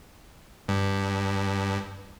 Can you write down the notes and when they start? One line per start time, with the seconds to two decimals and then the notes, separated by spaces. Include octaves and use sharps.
0.68 G2